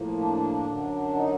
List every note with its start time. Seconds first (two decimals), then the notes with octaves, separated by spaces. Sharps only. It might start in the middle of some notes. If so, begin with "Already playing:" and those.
Already playing: A2 F3 A#3
0.17 D4
0.65 F#2 D3 F#3
1.14 D#4